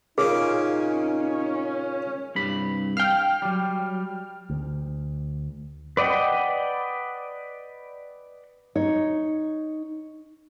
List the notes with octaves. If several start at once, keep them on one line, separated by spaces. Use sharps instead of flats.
A#2 C#3 C#4 D#4 G#4 D6
C2 G2 B5
F5 G5 F6
F#3 G3
D2
B4 D5 D#5 F#5 G5
D#4 C#5